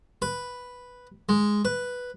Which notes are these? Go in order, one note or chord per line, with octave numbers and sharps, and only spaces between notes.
B4
G#3
B4